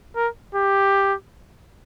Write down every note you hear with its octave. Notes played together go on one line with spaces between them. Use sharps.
A#4
G4